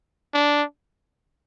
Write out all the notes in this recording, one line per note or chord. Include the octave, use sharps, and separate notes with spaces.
D4